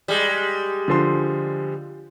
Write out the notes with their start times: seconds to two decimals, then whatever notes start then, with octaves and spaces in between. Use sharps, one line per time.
0.08 G3 G#3
0.88 D3 F3 C6